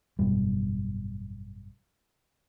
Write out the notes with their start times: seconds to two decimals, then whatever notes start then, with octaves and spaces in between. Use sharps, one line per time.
0.19 G#1 F#2 B2 G3